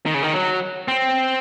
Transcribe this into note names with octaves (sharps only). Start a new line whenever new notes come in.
D#3
C#3
D#3
F#3
C4